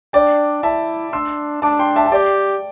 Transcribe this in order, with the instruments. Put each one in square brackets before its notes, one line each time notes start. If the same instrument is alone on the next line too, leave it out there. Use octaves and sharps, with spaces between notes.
[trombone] D4 [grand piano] D5 G5
[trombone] E4 [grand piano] E5 A5
[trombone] D4 [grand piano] C6 E6
[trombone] D4 [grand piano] A5 D6
[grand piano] G5 C6
E5 A5
A5
[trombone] G4 [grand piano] D5 G5